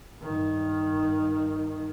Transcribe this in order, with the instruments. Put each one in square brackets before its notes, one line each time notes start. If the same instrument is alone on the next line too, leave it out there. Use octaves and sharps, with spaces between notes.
[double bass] G2 D#3